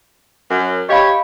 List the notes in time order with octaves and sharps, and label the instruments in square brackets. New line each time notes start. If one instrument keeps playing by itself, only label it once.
[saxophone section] F#2
[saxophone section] G4 C#5 [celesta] D#5 F5 B5